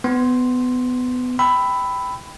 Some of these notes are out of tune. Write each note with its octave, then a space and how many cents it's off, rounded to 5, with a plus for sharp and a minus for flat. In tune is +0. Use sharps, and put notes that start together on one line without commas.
B3 +20 C6 +0
G5 +0 B5 +10 E6 -5